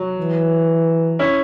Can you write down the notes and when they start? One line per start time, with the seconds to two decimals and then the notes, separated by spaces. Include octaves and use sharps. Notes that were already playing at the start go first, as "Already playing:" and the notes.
Already playing: F#3
0.17 E3
1.19 C#4 E4